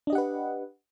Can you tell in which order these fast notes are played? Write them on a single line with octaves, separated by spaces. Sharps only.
D4 D#5 G4 F#5 B4